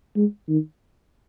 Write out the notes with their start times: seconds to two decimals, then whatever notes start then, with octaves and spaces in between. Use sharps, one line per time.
0.16 G#3
0.49 D#3